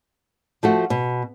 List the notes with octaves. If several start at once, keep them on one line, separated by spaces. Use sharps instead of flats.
F3 A3 F#4
B2